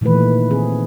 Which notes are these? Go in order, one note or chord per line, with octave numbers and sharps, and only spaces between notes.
A#2 D#3 E3 A3 B4
D#3 C4 G#4